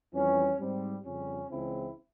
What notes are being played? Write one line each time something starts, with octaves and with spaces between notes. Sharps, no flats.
F2 E3 G3 C#4
G#2 G3 C4
F2 C#3 G3 C#4
C#2 C#3 E3 G#3 C4 E4